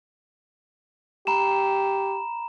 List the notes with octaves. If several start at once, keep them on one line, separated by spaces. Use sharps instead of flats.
G4 A#5 B5 E7